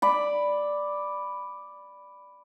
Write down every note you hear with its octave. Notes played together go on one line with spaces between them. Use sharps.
D5 B5